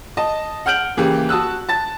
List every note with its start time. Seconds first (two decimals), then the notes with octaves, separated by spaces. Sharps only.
0.17 D#5 A5
0.66 F#5 F6 G6 D7 F#7
0.97 C#3 E3 A#3 G4
1.29 F#4 A5 D#6 E6 F#6
1.69 A5 A6